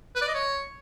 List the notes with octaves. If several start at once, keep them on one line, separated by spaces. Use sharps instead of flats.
B4
D5
D#5
C#5